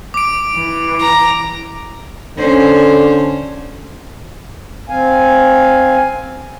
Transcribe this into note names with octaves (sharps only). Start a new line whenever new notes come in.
D6 D7
E3
A#5
D3 C#4 C5
C4 F5 G#5